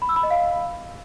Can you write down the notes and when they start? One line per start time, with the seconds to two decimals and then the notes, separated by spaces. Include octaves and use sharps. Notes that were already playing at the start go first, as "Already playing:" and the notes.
0.02 B5
0.09 E6
0.16 B5
0.23 D#5
0.31 F5